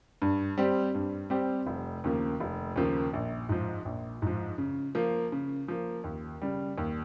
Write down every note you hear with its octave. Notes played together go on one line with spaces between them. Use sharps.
G2
G3 C4 G4 C5
G2
G3 C4 G4 C5
F1
D#2 C#3 F3 A#3
F1
D#2 C#3 F3 A#3
A#1
G#2 F3
A#1
G#2 F3
C#3
F3 A#3
C#3
F3 A#3
D#2
C#3 G3
D#2